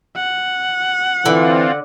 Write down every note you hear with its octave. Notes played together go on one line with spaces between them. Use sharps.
F#5
D3 E3 C4 F4